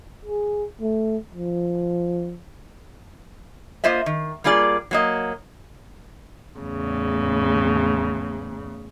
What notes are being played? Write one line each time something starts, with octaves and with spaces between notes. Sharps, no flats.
G#4
A3
F3
A#3 F4 C5 D#5 E5
D#3
G3 A#3 F4 G#4 D5
F#3 A#3 D#5
E2 A2 C#3